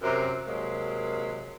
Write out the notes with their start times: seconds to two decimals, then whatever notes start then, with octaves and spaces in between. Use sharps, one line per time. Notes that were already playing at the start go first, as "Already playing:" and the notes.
0.02 F#2 C3 A#4
0.47 C3 F#3 G#3 A#3